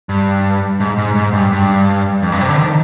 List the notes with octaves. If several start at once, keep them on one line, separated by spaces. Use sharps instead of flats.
G2
G#2
G#2
G#2
G2
G2
F2
G2
C3
D3
D#3